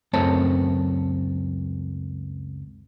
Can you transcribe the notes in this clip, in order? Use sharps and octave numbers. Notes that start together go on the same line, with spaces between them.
C#2 F#2 A3 C4 C#5 A5